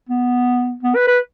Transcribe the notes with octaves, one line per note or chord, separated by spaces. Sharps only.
B3
B3
B4
B4